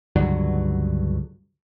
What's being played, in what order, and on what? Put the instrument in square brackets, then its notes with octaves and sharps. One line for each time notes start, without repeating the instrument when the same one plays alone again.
[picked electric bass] C#2 G2 D3 F#3